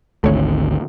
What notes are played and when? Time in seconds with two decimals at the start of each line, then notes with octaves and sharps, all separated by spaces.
0.24 G#1 D2 A3 C#5